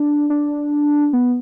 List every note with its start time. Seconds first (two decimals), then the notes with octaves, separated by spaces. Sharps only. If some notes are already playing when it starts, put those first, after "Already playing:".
Already playing: D4
0.30 D4
1.13 B3